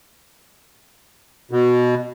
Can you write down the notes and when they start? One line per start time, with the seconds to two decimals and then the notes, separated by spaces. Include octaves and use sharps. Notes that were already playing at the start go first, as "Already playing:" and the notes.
1.51 B2